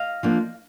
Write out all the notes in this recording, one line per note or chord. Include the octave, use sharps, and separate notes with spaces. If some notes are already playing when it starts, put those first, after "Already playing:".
Already playing: D#5 F5
F3 A#3 D4